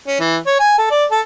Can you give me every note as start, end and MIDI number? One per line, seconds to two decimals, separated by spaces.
0.07 0.18 61
0.20 0.37 52
0.46 0.58 73
0.59 0.75 80
0.78 0.88 69
0.91 1.04 74
1.11 1.21 69